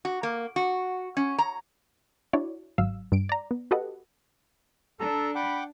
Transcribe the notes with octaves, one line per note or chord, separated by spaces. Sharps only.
F#4
A#3
F#4
C#4
A#5
D4 E4 F#4 C#5 D5
G#1 F#3 F5 E6
G2 D7
D5 A#5
B3
F#4 G4 A4 B4 D#5 F#5
D4 A4 A#5 E6
F#5 G5 B5 D6